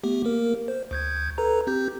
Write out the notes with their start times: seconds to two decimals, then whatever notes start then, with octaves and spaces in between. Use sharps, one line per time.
0.04 A3 B3 G4
0.25 A#3 A#4
0.68 C5
0.91 D2 G6 G#6
1.38 A4 B4 A#5
1.67 C4 G4 G6